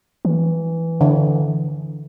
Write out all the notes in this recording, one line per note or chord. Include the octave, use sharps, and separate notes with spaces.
E3
D3